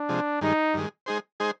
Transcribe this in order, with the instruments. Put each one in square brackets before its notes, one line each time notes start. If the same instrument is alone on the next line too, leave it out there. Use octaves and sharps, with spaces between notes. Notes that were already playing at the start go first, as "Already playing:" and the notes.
Already playing: [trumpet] D4
[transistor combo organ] C3 F3 G#3
[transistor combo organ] G2 D#3 G#3 [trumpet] D#4
[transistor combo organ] G2 D#3 G#3
G#3 D#4 G#4 C5
G#3 D#4 G#4 C5